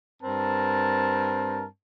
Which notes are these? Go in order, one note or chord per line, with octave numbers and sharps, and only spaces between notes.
G2 C4 A#4 A5